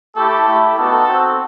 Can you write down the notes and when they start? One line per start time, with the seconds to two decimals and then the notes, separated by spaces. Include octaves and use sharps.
0.15 A3 E4 G4 A4
0.46 A3 E4 G4
0.76 B3 D#4 F#4 A4
1.06 C4 F#4